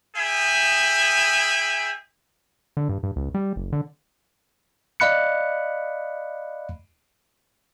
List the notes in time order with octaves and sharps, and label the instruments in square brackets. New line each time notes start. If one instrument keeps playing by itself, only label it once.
[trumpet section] D#4 G#4 E5 G5 G#5 B5
[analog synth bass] D3
G2
G2
C#2
G3
F#1
D3
[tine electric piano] D5 D#5 F5 B5 F#6 C#7